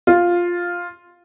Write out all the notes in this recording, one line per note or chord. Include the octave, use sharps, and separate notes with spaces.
F4